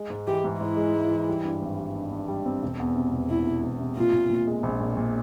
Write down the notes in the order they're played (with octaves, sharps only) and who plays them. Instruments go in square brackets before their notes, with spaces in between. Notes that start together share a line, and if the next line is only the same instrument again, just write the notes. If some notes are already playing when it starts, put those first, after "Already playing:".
Already playing: [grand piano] G#3
G#2
[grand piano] E3 [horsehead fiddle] G4
[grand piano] G#2
[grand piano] G#2 [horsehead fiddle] E4
[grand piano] G#3
G#3
E3
G3
G2
G#1
G3
G2
G2
G3
C4
E1
E2
C3
E1
[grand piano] E1 [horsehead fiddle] E4
[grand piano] E1
E1
C3
[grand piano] A#2 [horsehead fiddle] F4
[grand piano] A#2
A#2
G#3
A#1
A#2
A#2